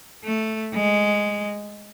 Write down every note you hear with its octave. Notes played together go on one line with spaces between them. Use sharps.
A3
G#3